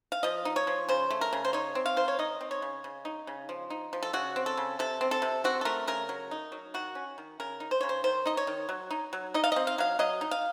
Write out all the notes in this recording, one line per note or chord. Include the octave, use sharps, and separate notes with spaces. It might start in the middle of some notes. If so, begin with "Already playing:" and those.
F5
F3 D#5
D#4
C#5
F3
C#3 C5
A3
A#4
C#3
C5
D#4 C#5
C4
F5
D#3 C5
C#5
D#4 D#5
C4
C#5
C#3
C#3
D#4
C#3
F3
D#4
F3
A4
C#3 F#4
C4
A4
C#3
C3 A4
C4
A4
C3
C4 F#4
A4
A3 A#4
C#3 A#4
F#3
D#4
F#3
D#3 F#4
C#4
D#3
C#3 A#4
D#4
C5
C#3 C#5
C5
D#3 C5
D#4 D#5
C#5
D#3
F#3
D#4
F#3
D#4 D#5
F5
C4 D#5
F5
F#3 F5
F#3 D#5
D#4
F5